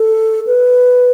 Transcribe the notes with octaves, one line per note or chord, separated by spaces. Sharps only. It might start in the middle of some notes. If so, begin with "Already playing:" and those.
Already playing: A4
B4